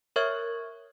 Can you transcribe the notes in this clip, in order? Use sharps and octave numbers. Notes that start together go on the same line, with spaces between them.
A#4 C#5 E5 C#6 F6 G#6